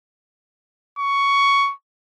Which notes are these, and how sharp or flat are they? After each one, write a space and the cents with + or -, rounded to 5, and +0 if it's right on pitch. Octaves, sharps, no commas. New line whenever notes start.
C#6 +10